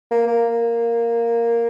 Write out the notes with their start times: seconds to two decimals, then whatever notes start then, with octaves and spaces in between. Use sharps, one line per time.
0.11 A#3
0.27 A#3